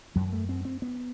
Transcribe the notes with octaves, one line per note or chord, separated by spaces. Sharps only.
F#2 F#3
A3
C4
C4
B3